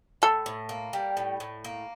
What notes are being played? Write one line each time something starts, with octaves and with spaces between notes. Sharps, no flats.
A2 A4
A2
A#3
G3
A2
A2
A#3